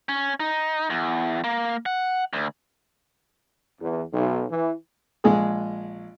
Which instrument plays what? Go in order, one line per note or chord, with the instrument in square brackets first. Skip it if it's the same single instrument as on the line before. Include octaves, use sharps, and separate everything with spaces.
[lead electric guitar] C#4
D#4
E2
A#3
F#5
D2
[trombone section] E2
B1
E3
[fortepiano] A#1 G#3 G#4